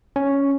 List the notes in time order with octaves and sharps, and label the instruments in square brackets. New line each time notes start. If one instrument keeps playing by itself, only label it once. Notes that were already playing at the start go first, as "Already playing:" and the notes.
[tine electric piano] C#4